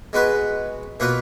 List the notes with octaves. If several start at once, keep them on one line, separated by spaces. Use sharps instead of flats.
G#3 B3 F#4 B4
B2 A#3 F4 B4